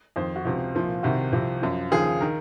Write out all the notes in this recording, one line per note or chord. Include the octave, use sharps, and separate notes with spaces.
F2 D#3 C5
F#4
C#2 C3 F3
C2 A#2 F3
C2 C3 D#3 F#4
C2 C3 F3
F#2 F3
D#2 C#3 F3 G#4
D#3 A#4